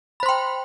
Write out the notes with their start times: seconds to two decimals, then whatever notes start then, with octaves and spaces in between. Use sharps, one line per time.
0.20 B5
0.23 C5
0.26 C6
0.29 G5